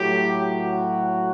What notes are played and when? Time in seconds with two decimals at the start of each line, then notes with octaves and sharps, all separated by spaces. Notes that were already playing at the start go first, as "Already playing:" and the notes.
Already playing: A2 F#3 G4
0.60 F#4